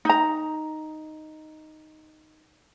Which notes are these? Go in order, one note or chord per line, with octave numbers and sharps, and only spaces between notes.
D#4 A#5